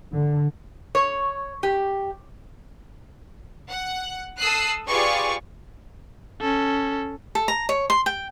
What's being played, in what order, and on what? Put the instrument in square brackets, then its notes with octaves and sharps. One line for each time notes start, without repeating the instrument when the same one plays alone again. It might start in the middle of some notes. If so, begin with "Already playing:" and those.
[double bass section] D3
[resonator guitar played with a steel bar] C#5
G4
[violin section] F#5
A4 D#6 E6 F#6 C7
F4 G4 G#4 B4 D5 C#6
[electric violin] C#4 A4
[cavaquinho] A4
A#5
C#5
C6
G5